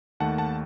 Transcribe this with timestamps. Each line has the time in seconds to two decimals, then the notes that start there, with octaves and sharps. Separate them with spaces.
0.20 D#2 D#3 A3 F#5 A5
0.38 F#5 A5